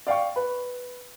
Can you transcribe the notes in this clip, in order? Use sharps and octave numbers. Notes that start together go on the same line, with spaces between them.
D5 F5 G5 C#6
B4